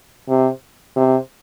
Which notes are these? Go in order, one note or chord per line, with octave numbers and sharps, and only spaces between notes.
C3
C3